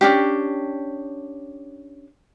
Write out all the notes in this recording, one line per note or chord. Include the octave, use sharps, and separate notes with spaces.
C#4 D4 G4